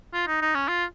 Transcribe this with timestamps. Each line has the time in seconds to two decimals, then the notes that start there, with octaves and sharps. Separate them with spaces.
0.13 F4
0.27 D#4
0.42 D#4
0.55 C#4
0.68 F4